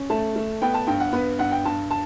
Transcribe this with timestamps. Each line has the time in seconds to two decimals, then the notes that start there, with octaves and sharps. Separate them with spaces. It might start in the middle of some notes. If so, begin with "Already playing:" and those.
Already playing: C#4
0.10 A3 A5
0.36 A3
0.62 B3 G5
0.74 A5
0.87 G2 G5
1.00 F#5
1.13 B3 B4
1.39 G2 F#5
1.52 G5
1.65 G2 A5
1.91 A5